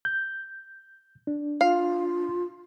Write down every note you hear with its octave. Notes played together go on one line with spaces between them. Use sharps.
G6
D4
F4 F5